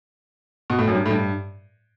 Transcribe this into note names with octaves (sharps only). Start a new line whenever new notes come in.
B2
A2
F#2
G2
A2
G2